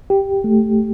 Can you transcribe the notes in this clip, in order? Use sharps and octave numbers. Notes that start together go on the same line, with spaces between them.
G4
A3